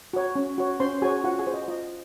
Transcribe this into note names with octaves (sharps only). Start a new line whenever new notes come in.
F#4 C#5
C#4
F#4 C#5
C#4 C5 C6
F#4 G#4 C#5 G#5
F4 F#4 F#5
G#4 G#5
C5
D#5
F4 D#5